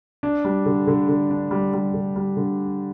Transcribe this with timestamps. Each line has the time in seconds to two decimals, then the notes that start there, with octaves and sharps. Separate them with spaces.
0.23 D4
0.45 G3
0.66 D3
0.87 D3
1.09 D3
1.31 D4
1.51 G3
1.73 G3
1.94 D3
2.16 G3
2.37 D3